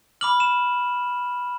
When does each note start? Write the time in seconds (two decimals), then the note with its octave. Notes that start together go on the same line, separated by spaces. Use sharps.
0.21 B5 D6 F6 F#7
0.40 E7